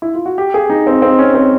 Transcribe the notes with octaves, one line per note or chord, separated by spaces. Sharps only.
E4
F4
F#4
G4
G#4
D#4
C4
C4
C#4
C4